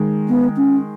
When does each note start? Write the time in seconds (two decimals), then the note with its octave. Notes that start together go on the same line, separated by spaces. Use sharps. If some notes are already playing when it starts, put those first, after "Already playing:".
Already playing: D#3 G#3
0.29 B3
0.57 C#4